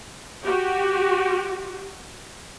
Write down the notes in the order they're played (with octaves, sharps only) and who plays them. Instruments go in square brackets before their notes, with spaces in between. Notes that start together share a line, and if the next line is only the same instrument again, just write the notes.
[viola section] F#4 G4